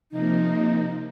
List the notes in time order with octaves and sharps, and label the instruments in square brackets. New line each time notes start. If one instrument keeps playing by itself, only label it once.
[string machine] C3 F3 A#3 [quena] D#4